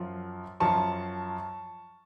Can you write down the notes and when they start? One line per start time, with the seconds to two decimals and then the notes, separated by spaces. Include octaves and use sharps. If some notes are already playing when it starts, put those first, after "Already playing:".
Already playing: F#2 F3
0.60 F#2 F3 A5 C#6